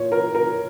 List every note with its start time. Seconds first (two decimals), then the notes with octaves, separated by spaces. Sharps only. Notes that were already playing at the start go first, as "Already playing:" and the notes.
Already playing: A#2 C#5
0.12 A#4
0.35 A#4